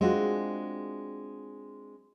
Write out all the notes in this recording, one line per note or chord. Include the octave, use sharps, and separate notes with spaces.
G#3 C4 D4 F4 F#4 G#4